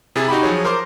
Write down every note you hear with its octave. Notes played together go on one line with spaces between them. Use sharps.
C3 E4 G#4 A6
D#4 F#4 G4 B5
F3 F#3 G#4 C#5
A#4 C5 C6 D6